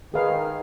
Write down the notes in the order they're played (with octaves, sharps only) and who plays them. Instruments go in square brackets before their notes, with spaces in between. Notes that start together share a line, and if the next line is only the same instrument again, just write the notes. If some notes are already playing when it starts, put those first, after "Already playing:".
[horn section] D#3 [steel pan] G#4 B4 F5